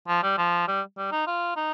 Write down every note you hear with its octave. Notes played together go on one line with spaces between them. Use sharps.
F3
G3
F3
G3
G3
D#4
F4
D#4